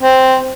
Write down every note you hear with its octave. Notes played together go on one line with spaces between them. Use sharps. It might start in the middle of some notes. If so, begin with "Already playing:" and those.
C4